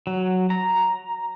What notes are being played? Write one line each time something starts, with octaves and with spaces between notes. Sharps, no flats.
F#3
A#5